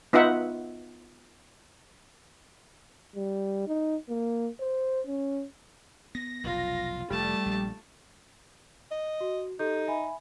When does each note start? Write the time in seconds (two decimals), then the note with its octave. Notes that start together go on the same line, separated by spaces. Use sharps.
0.13 B3 D#4 F4 E5 F#5
3.16 G3
3.67 D#4
4.09 A#3
4.60 C5
5.07 C#4
6.15 B3 A#6
6.44 F1 B1 F4
7.10 F1 G3 A3 A5
7.46 A#1
8.91 D#5
9.21 F#4
9.59 D#4 G4 A4 G6
9.87 E5 G#5 B5